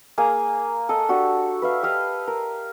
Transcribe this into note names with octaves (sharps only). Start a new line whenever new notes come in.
A#3 G#4 G#5 A#5
A4 D#5
D4 F#4 G4
B4 E5 F5
G4 D#5 F5
A#4